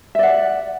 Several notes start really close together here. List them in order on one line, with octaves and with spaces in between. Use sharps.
E5 D5 F#5